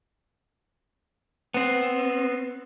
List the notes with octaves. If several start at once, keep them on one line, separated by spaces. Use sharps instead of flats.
B3 C4